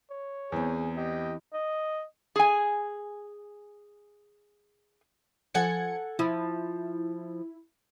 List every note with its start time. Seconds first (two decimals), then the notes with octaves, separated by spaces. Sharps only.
0.11 C#5
0.52 E2 E3 C4 G#4
0.97 G4 D#5
1.53 D#5
2.36 G#4 G#5
5.54 F3 A4 F#5 G#5 G#6 C#7
6.19 F3 E4